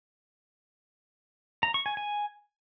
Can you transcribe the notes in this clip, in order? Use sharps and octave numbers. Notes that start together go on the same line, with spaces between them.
A#5
C#6
G#5
G#5